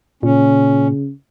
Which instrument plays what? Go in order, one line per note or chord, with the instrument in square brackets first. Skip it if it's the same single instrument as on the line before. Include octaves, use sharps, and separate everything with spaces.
[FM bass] A#2 [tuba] C#3 [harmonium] C#4